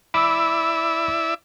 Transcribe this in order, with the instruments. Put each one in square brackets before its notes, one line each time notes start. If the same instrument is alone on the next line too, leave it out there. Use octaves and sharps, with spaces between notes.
[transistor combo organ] E4 D5 E5 [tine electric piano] B5 D6 E6